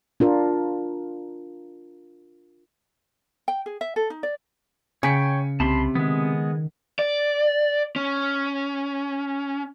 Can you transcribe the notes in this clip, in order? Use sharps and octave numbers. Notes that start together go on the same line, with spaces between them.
D4 F4 A#4
G5
G#4
E5
A4
D#4
D5
C#3 C#5 G5 G#5 B6 C#7
C2 C3 A5 B5 C6
D#3 G#3 B3
D5
C#4